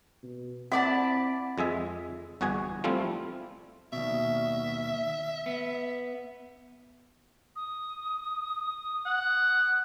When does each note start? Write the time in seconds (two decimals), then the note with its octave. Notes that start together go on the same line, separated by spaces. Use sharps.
0.23 B2
0.72 C4 E4 D5 F#5 A5
1.58 F2 G#3 G#4 E5
2.41 G1 E2 F#4 G#4 G#5
2.84 F3 G3 A3 C4 E4 F4
3.93 D#2 B2 E5
5.46 B3
7.56 D#6
9.06 F#5